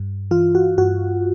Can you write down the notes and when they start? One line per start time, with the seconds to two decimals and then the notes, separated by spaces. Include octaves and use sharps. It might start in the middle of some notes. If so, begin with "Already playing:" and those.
Already playing: G2
0.31 E3 F4
0.55 F#4
0.78 G2 F#4